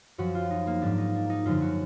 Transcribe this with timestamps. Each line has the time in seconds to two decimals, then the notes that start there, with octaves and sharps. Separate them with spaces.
0.18 F#2 F3 F#4
0.35 F4
0.50 D#4
0.67 A#3
0.82 G#2 F3 D4
0.98 D#4
1.15 D4
1.30 D#4
1.45 F#2 D3 F3 F4
1.61 F#4